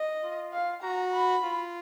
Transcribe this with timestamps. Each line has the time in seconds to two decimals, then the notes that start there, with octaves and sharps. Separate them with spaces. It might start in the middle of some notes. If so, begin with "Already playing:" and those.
Already playing: D#5
0.23 F4
0.53 F5
0.83 F#4 A#5
1.13 B5
1.43 F4